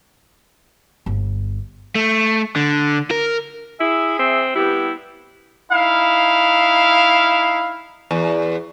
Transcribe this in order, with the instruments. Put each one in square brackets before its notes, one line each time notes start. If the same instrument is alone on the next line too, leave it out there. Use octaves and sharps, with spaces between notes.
[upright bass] G1
[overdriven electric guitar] A3
D3
A#4
[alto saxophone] E4 [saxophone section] G#4 E5
[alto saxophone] C4
[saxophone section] G3 B3 G4 [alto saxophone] E4
[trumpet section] D#4 E4 F5
[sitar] E2